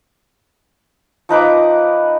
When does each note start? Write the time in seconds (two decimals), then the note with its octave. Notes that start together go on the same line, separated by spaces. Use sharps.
1.29 F3 D#4 B4 D6